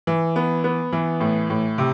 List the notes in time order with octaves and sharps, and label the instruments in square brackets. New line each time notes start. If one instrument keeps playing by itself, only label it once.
[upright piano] E3
B3
B3
E3
A2
A2
C3